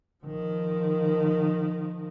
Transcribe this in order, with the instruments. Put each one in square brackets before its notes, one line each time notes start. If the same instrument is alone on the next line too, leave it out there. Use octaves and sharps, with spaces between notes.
[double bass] D#3 F3